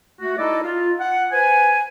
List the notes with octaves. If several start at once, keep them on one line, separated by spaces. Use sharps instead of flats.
A3 F#4
D#4 E4 A4 D5 D#5
F4
F#5
B4 C5 G#5